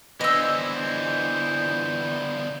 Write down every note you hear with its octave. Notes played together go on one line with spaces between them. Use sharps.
D3 E3 B3 C5 D#5 E6